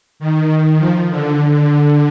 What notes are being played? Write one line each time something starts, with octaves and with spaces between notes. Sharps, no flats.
D#3
F3
D3